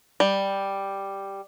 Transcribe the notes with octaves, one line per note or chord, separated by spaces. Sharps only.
G3